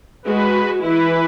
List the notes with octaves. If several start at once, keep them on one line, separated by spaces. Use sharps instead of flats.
G#3 F#4 B4
E3 E4 B4